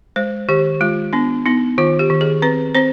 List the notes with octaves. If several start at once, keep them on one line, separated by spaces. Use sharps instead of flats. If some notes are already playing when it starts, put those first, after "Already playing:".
G#3 C5
D#3 G4
G#3 F4
B3 D4
B3 D#4
D#3 F4
G4
D#3
G#4
C4 B4
C4 C5